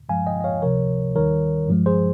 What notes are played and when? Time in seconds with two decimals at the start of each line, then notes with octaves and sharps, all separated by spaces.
0.09 G2 F3 G#3 F5 G#5
0.27 D#5 G5
0.40 D#5
0.44 C#5 F5
0.62 C#2 C3 F3 A#4 C#5
1.15 D#2 D#3 G3 A#4 C#5
1.69 G2 F3 G#3
1.86 G#4 C5